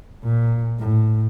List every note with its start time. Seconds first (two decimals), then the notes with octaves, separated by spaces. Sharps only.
0.24 A#2
0.79 A2